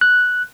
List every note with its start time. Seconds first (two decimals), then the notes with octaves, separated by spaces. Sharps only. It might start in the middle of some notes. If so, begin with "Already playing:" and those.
0.01 F#6